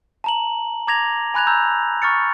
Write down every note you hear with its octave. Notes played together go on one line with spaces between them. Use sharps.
A5 A#5 F#7
A#5 D6 G#6 A#6 F7
G#5 B5 F#6 G#6 F7
A#5 E6 G6
C#6 F6 A6 C#7